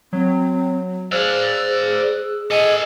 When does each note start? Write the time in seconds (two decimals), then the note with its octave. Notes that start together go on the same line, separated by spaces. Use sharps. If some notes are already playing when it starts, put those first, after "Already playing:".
0.13 F#3 C4
1.12 G#4 C5 D5 F5 E6 F#6
2.51 A4 D#5 G#5